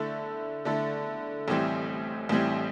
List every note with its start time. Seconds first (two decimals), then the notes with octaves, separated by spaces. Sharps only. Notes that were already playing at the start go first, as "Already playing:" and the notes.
Already playing: D3 A3 E4 A4
0.65 D3 A3 E4 A4
1.48 A1 A2 E3 G3 C4
2.29 A1 A2 E3 G3 C4